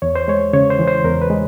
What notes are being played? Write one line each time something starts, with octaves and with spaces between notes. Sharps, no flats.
E2 C#5
C5
G#3 C#5
C#3 C#5
C5
E3
C5
E2 A#4
B4
G#3